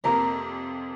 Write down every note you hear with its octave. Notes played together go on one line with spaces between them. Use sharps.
F2 C3 A#3 A#4 A#5